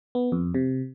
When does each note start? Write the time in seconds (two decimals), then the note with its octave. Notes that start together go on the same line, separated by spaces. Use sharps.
0.15 B3
0.32 F2
0.54 C3